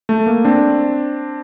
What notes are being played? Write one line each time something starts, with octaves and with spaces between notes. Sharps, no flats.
A3
A#3
C4 D4